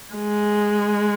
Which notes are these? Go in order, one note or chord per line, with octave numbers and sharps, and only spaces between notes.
G#3